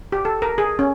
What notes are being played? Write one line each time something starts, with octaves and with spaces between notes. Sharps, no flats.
G4
A4
A#4
G#4
C#4